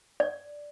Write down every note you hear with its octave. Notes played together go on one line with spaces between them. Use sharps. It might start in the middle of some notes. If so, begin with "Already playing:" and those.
D5